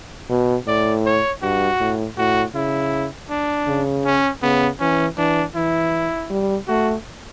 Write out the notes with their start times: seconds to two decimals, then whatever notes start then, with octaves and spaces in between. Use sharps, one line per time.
0.29 B2
0.67 A2 D5
1.06 C#5
1.42 G2 F#4
1.80 A2
2.17 A2 F#4
2.55 C#3 E4
3.30 D4
3.67 C#3
4.05 C#4
4.42 C#3 B3
4.80 E3 C#4
5.18 E3 D4
5.55 E3 E4
6.30 G3
6.68 A3 F#4